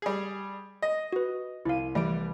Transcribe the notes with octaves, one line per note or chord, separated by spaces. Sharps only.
G3 G#4
D#5
F#4 B4
C2 E4 F5 D#7
E3 G3 A3 D7